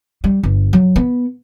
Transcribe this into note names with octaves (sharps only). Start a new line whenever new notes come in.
G3
G1
F#3
B3